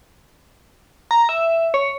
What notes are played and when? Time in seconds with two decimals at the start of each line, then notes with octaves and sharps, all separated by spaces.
1.11 A#5
1.29 E5
1.74 C#5